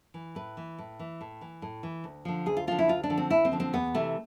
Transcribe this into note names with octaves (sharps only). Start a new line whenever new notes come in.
E3
A2 B4
E3
A2
E3
A2
E3
A2
E3
D2
D3 F3
D2 G#4
F4
D3 F3 F4
E4
D2 F4
D4
D3 F3
C4
D2 E4
C4
D3 F3
C4
E2 B3
C3 E3 A3